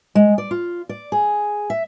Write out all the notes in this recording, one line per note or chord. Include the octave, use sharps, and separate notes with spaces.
G#3
D5
F4
D5
G#4
E5